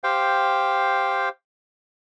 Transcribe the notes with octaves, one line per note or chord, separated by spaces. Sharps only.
G4 C5 F5 G5